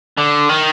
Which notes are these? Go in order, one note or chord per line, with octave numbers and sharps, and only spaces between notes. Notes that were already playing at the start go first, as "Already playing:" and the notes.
D3
D#3